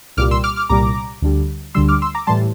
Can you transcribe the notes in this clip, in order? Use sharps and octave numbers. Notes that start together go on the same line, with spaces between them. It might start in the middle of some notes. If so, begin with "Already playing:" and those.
C2 A#2 G3 D6 F6
C6 E6
D6 F6
D6 F6
C2 A#2 G3 A#5 D6
D2 D3 G3
D2 D3 G3 C6 E6
D6 F6
C6 E6
A#5 D6
A2 E3 G3 A5 C6